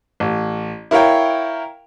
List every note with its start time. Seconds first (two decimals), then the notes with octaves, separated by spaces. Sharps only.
0.20 A1
0.91 E4 A#4 C#5 F5 G5